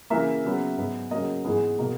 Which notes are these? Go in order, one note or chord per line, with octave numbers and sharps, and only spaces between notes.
C#3 E3 A#3 E5
C#3 F#3 B3
G#2 F#3 B3
C#3 F#3 A#3 D#5
G#2 E3 B3 G#4
B2 A#3